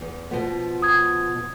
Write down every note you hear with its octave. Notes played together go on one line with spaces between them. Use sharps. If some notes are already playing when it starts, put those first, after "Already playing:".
E2
B2 F3 B3
D#6 G#6